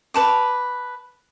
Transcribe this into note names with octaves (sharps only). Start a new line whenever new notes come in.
B4 A5 D6